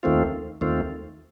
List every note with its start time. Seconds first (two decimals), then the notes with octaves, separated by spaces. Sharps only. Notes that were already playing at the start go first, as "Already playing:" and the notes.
0.03 D#2 D#3 A3 C4 F4
0.61 D#2 D#3 A3 C4 F4